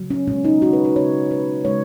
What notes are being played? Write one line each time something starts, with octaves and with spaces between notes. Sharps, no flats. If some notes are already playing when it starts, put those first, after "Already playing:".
Already playing: C#3 F#3
C#4
B2 G#3 C#4
D#4
F#4
B4
B4
C#3 G#3 C#5
B4
C#3 G#3 C#5